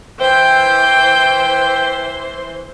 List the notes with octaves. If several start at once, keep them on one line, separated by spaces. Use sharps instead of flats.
E3 C5 G5